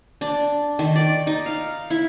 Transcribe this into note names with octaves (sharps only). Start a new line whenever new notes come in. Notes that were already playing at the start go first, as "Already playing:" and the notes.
D4
D#3
D5
D#4
F5
E4